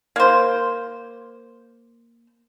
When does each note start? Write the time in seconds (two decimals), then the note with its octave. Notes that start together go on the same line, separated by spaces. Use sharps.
0.16 A#3 C5